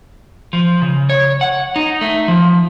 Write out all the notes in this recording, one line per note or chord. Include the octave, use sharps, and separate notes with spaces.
F3
C#3
C#5
F#5
D#4
A3
F3